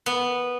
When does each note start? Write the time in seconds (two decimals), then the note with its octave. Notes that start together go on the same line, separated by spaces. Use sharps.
0.06 B3